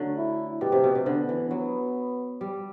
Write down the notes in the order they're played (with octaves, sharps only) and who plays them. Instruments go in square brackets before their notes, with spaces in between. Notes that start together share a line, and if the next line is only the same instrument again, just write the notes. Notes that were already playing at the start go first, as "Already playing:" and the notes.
Already playing: [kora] D3 F#3 A3
[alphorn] E4
[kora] B2 [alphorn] G4
[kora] C3
B2
C3
[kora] D3 [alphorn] B3
[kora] E3
F#3
G3